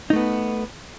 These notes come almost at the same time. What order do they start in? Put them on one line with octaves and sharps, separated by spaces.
D#4 A3 B3